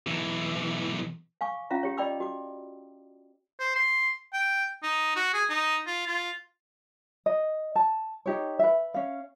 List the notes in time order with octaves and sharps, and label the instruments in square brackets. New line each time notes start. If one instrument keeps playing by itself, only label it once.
[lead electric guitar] B1 E3
[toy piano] F5 G#5 C#6 D6
C#4 F4 E5 F5 A#5
G4 C#5
D5 D#5 G5 B5 D6 E6
F#4 D6
[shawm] C5
C6
G5
D#4
F#4
G#4
D#4
F4
F4
[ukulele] D#5
A5
D#4 G4 C#5
B4 E5
C#4 F5